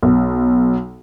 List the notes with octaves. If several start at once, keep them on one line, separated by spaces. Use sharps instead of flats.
B1